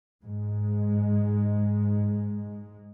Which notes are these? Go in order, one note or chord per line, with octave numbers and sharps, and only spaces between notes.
G#2 G#3